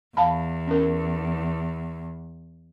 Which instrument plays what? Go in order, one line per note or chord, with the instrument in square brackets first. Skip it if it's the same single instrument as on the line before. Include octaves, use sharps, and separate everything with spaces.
[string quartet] E2 [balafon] F5 A5 B5
[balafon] C#4 A#4